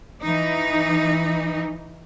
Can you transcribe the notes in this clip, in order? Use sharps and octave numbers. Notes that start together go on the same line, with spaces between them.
E3 D#4